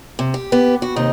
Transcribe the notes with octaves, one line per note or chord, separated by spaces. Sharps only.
C3
G4
B3 G4
F#4
D#2 C3 D#4 D#5